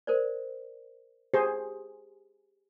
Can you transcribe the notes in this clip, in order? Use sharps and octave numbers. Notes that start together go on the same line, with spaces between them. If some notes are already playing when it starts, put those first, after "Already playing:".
A#4 C5 D5
G4 G#4 C5